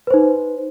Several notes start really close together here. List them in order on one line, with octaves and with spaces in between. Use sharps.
B4 C5 D#4